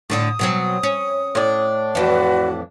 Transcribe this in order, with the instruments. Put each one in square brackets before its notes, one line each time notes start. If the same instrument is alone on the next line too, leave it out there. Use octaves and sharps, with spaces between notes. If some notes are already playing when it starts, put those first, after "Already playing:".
[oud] A2 D3 D4 [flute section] D#6
[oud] B2 F#3 C4
C#4
[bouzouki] A2 D4
[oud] F2 E3 [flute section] F#4 B4 D5